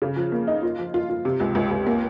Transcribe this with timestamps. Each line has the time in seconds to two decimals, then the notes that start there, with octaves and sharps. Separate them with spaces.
0.02 C#3
0.16 F3
0.32 A#3
0.47 D#4
0.63 F4
0.79 F3
0.94 F4
1.09 F4
1.25 C3
1.40 C#2
1.55 C#2
1.71 C#2
1.86 A#3